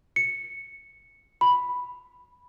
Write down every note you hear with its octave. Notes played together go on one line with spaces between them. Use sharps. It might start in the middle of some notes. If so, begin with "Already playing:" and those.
C#7
B5